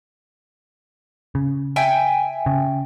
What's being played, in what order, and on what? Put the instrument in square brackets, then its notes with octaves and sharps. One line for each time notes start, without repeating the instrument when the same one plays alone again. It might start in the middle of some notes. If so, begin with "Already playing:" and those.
[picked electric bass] C#3
[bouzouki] E5 G5 G#5
[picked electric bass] C#3